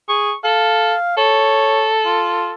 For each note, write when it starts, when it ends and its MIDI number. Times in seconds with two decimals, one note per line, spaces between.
0.09 0.32 68
0.09 0.35 85
0.44 0.94 69
0.44 1.13 77
1.17 2.53 69
1.17 1.91 73
2.05 2.53 65